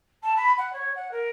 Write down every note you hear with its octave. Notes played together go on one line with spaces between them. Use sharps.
A5
B5
F#5
C#5
F#5
A#4